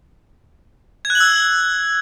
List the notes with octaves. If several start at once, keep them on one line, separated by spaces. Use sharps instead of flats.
G#6
F#6
F#7
E6